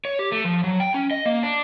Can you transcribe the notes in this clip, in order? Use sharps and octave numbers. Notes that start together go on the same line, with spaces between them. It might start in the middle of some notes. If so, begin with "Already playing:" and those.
C#5
G4
A3
F3
F#3
G5
C#4
D#5
A#3
D4